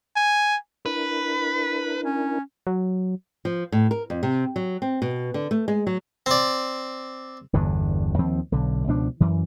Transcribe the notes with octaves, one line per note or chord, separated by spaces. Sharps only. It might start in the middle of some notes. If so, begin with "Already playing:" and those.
G#5
D4 E4 A#4 B4
C#4
F#3
F3
A2
A#4
F2
C3
F#3
C4
B2
D3
A3
G#3
F#3
C4 D5
G1 E2 G2 D3
D#2 F3 C4
B1 D3
C#2 B2 F3 D4
F#2 E3